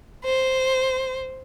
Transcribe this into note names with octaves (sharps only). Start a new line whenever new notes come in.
C5